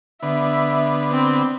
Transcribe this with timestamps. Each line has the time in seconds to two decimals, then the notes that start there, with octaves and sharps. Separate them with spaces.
0.23 D3 B3 E5
1.11 C4